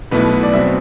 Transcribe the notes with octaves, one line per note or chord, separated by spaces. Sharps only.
B1 B2 A3 E4 B4
D5
B2 F#3 C4 E5